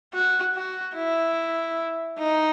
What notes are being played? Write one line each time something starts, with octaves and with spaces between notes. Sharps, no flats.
F#4
F#4
E4
D#4